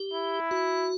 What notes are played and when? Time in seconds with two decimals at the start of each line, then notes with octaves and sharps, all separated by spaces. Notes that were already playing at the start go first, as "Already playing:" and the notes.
Already playing: G4
0.14 E4
0.51 F#4